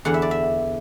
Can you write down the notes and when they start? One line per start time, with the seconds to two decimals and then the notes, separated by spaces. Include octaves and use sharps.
0.05 E2 D3 F#5
0.14 E5
0.22 D5
0.31 E5